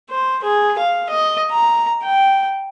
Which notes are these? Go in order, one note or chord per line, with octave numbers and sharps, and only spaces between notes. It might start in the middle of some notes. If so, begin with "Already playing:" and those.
C5
G#4
F5
D#5
A#5
G5